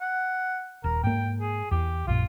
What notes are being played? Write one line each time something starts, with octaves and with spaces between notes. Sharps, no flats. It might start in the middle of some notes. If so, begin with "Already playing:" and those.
F#5
D#1 A#4
G#2 A#3 G5
G#4
E2 G4
A#1 F#2 A#2 F4